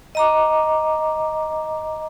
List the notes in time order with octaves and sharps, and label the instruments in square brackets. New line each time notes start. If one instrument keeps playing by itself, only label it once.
[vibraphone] D#5 A#5 D6